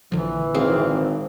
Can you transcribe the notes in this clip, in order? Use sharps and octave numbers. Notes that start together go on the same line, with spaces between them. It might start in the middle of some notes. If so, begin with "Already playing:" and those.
A#1 D3 E3 F3
G#1 C4 G#4 F5